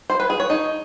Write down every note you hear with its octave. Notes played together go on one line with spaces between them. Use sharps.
C5
B4
G#4
C#5
D#4